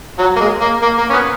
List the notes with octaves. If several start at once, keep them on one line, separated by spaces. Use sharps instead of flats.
F#3
A#3
G#3
A#3
A#3
A#3
C#4
B3